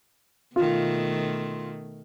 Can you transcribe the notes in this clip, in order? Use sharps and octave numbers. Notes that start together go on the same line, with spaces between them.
B2 D#3 A3 F4